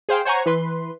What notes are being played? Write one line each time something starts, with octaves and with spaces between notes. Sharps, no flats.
G#4 C5 F5 G5
C5 C#5 F#5 G#5 A#5 C#6
E3 B4 C6